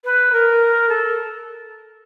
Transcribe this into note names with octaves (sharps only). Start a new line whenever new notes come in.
B4
A#4
A4